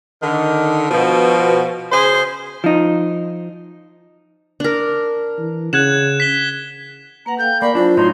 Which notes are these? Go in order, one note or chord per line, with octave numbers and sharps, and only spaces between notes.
D3 D#3
B2 F3
C#3 G#4 C5
F3 D#4
D4 A#4
E3
C#3 F#5 F#6 G#6 E7
B6 G7
A#3 B4 F#5 A#5
A4 F5 G5 G6
A#3 D5 G#5 B5 C#6 D6
F#3 D4 E4 F4 C5
A2 F#3 D#4 C#5 C6